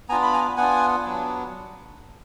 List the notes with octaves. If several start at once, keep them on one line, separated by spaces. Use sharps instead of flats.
B3 D4 F4 G#5 A#5
B5
G#5 A#5
B3 D4 F4 F#5 G#5
F#3 B3 D4